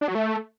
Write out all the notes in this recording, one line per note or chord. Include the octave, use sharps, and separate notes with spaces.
D4
F#3
A3